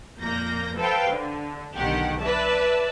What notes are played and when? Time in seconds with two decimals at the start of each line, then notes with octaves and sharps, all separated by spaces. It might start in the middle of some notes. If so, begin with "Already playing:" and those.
0.19 F2 A#2 A#3 G6 A#6
0.77 A4 B4 C5 F5 G5
1.10 D3
1.76 B1 D3 D#3 G4 F#5
2.20 B4 D5 E5 A5